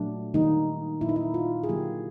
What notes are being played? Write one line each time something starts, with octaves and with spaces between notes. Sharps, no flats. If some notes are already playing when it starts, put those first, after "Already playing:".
Already playing: A#2 F#3 A3 D4
D#3 G3 A#3 D#4
A#2 F#3 A#3 E4
D#4
E4
F4
G#4
D3 F#3 A#3 G4